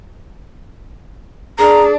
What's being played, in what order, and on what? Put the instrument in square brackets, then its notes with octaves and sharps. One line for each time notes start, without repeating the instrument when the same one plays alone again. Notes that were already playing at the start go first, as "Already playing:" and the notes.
[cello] D4 [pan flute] G#4 [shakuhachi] A#5